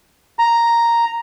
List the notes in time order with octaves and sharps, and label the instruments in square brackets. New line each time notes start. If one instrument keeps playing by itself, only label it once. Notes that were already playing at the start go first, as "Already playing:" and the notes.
[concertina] A#5